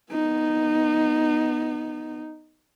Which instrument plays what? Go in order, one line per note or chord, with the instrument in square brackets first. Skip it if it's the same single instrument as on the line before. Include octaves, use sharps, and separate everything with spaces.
[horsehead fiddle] B3 D#4